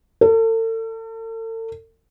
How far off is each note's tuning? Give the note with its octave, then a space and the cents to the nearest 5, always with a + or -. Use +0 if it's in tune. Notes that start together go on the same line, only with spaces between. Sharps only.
A4 +40